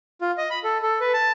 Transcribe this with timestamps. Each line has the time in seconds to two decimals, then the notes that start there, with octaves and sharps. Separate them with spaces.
0.21 F4
0.38 D#5
0.50 B5
0.64 A4
0.83 A4
1.01 B4
1.13 A5